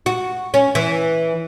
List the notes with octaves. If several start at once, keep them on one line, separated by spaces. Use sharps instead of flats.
F#4
C#4
E3